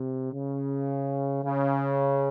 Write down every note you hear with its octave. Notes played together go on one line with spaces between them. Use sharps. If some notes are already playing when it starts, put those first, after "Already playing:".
Already playing: C3
C#3
C#3